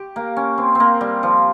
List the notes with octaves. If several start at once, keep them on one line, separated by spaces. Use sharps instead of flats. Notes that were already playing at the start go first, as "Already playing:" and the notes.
Already playing: G4
A#3
C#4
C4
A#3 C4
G3
F3